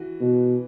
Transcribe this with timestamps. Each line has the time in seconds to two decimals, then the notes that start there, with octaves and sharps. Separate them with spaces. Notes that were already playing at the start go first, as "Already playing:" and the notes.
Already playing: E3 F#4
0.21 B2